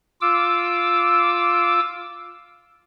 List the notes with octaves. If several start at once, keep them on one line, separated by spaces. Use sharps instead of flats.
F4 D6 E6